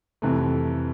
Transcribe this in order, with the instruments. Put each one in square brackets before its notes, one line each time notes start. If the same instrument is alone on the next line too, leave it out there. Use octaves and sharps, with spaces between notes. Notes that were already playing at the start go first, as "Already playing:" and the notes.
[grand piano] F2 C3 E3 A3